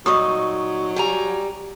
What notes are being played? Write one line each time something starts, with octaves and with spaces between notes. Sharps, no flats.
A#2 F#3 D#4 C#6 D#6
G3 G#5 A#5